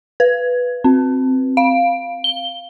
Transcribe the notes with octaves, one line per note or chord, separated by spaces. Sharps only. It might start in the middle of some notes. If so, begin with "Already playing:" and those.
B4
C4
F5
G7